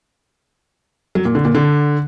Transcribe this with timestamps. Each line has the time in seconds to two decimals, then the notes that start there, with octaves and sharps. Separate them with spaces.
1.15 F#3
1.25 A#2
1.35 D3
1.45 A#2
1.55 D3